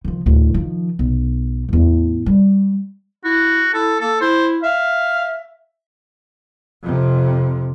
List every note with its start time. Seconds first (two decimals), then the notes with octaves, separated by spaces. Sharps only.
0.05 D#3 F3
0.26 D2 A2
0.54 D#3 F3
0.99 B1
1.69 A1 E2
2.26 G3
3.24 E4 F#4
3.74 E4 A4
4.00 A#3 A4
4.21 E4 C5
4.63 E5 F5
6.83 F2 C3